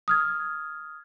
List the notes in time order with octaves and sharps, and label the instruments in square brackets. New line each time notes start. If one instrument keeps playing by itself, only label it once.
[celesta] D#6 F6 G#6